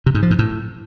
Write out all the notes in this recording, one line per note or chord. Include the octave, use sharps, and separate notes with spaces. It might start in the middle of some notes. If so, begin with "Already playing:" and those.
C3
G#2
F3
G#2
A2